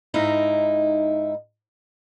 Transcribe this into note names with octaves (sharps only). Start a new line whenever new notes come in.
G#2 D#4 E4 F5 A#5